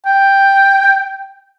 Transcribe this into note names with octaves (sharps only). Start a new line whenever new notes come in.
G5